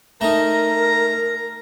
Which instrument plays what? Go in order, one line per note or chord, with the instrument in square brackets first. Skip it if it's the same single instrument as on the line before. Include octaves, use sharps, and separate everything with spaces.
[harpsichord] A3 D#4 [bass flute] A#4 [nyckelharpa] A#5